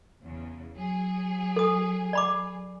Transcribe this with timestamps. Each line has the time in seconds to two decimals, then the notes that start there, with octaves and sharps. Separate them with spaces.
0.24 E2 C#3
0.75 F#3 G#4
1.56 A4 D#6
2.13 D5 B5 D6